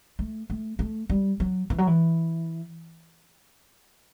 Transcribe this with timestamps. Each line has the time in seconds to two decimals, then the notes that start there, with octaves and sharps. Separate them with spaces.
0.19 A3
0.50 A3
0.79 A3
1.10 G3
1.40 F#3
1.70 E3
1.78 F#3
1.87 E3